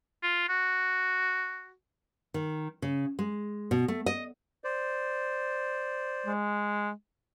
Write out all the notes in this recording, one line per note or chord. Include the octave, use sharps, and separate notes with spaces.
F4
F#4
D#3
C#3
G#3
B2
A3
D#5
C5 D5
G#3